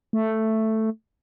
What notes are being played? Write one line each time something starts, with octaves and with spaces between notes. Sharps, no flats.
A3